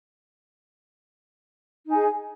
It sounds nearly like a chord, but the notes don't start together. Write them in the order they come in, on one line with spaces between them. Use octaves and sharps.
D#4 G#5 G#4